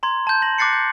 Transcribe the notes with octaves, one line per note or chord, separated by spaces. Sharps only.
A#5 C6 G#6
A5 G6
G6 A#6 F#7
D6 F#6 A6 C7 C#7
G6